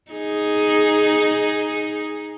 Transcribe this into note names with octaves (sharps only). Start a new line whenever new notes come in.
D#4 G#4